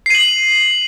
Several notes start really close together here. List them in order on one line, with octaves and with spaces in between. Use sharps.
C7 D#7 F#7